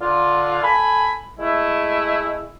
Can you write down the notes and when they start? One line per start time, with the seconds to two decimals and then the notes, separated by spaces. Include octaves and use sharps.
0.01 D3 F4
0.62 A4 G#5 B5
1.39 G#3 A3 E4